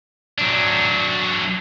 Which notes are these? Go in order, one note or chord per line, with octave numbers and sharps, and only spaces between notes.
F#3 D4